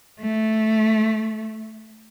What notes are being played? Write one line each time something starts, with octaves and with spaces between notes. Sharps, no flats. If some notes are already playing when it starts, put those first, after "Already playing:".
A3